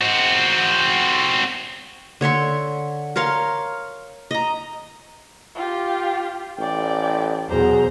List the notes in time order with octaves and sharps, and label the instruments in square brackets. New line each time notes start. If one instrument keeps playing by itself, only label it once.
[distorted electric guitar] C4 F#4
[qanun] D3 C#5 E5 C6
A#4 C#5 F5 C6
D#5 A#5
[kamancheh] F4 G4
[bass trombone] A1 [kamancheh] D5 G5
[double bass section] E2 B2 [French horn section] F#3 G#4 [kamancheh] C5 A#5